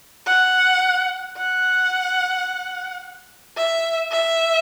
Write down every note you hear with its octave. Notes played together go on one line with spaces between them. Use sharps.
F#5
F#5
E5
E5